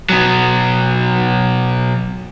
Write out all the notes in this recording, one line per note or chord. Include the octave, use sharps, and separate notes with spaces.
B2 F#3